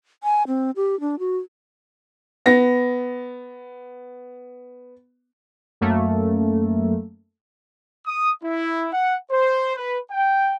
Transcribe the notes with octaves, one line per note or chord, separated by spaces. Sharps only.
G#5
C4
G4
D4
F#4
B3 A#6
F#2 A3 A#3
D#6
E4
F#5
C5
B4
G5